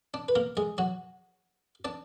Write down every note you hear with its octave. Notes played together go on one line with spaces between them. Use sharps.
D4
B4
A#3 A#4
G#3 G#4
F#3 F#4
D4 D5